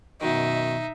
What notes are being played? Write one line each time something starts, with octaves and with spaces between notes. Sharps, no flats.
F#2 B2 D#3 D#4 E5